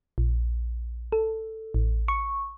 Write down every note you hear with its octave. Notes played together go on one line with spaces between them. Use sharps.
A#1
A4
A1
C#6